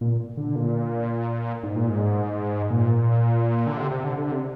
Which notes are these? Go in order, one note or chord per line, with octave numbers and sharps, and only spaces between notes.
A#2
D3
A#2
G#2
A#2
G#2
A#2
D3
C3
C3
D3
D3
C3